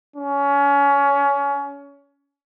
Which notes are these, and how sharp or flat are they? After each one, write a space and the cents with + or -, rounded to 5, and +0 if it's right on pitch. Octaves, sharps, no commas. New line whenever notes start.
C#4 +25